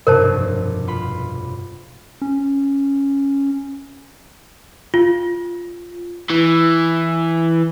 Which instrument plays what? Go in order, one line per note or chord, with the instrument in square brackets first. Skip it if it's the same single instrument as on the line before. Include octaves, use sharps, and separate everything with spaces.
[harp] F1 B1 G2 [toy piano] A#4 C5 A5
[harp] B3 F4 B5
[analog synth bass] C#4
[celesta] F4
[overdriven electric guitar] E3